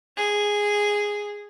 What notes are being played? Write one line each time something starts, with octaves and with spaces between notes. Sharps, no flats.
G#4